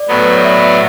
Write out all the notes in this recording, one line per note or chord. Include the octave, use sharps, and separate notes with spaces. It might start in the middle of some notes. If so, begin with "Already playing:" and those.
Already playing: D5
A2 F#3 B3
B4
C#5
D5
E5
E5